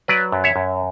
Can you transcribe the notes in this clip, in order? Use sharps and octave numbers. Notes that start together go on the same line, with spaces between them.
F#3 B4 D5
F#2
C#5 E5
F#2